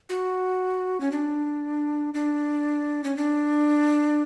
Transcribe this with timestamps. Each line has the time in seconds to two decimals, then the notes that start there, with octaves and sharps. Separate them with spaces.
0.09 F#4
1.00 C#4
1.12 D4
2.14 D4
3.04 C#4
3.17 D4